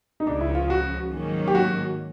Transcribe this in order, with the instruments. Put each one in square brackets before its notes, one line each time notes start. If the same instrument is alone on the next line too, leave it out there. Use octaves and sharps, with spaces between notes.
[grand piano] D#4
[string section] C#2 C#3 F3 [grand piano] D4
[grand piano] E4
F4
F#4
[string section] G#2 D#3 F#3 A#3 C#4
[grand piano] G4
F#4